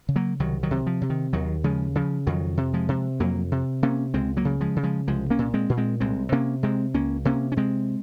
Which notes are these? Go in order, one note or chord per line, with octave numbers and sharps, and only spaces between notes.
C#3
F#3 A#3
C2 D#3 F#3
D#3 F#3
C3
F3
C3
D#3
D#2 D#3 F#3
C#3 F3 G#3
C#3 F3
F2 D#3 F#3
C3
F3 G#3
C3
F2 F#3 A#3
C3
C3 A#3 C#4
C#2 G#3 C4
F#3 A#3
C#3
F3 G#3
C#3
F3 G#3
C2 F3 G#3
A#3 C#4
A#2
G#3 C4
A#2
G#3 C4
C2 G#3 C4
C3 A#3 C#4
C3 G#3 C4
C#2 A#3 C#4
C3 A#3 C#4
C#4
C3 G#3 C4